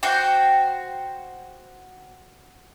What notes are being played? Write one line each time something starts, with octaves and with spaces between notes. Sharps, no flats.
F#4 C5 G5